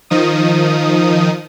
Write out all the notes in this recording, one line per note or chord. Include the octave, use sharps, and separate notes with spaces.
D#3 F3 D#4 D#6